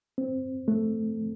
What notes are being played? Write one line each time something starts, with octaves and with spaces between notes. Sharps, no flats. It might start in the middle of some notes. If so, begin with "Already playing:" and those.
C4
A3